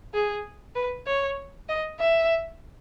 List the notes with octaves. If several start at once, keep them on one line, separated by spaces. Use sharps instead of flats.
G#4
B4
C#5
D#5
E5